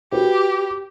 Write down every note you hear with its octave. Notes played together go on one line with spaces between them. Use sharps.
F#4 G4 B4